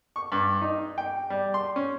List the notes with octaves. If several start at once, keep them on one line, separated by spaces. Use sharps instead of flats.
C#6
G2
D#4
G5
G3
C6
C#4